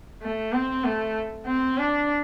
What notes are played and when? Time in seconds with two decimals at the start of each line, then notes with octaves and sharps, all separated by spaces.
0.22 A3
0.53 C4
0.84 A3
1.46 C4
1.78 D4